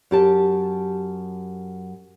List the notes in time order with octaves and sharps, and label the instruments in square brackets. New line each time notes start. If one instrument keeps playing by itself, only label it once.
[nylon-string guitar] F#2 G4 A5